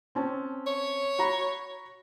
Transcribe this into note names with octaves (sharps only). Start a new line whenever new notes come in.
C4 C#4 A5
C#5
F#4 A#5 B5